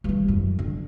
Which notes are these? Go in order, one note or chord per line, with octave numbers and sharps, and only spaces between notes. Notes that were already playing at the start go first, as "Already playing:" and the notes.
G2 E3
F#2
D3